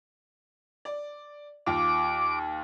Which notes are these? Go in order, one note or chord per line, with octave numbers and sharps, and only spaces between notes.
D5
D#2 F4 D6